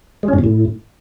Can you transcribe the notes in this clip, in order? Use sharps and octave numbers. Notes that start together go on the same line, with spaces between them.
G#3
C#4
G#2
B2
A2